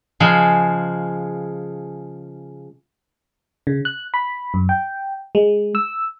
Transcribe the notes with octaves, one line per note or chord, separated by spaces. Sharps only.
C#3 F3 G#3
C#3
F#6
B5
F#2
G5
G#3
E6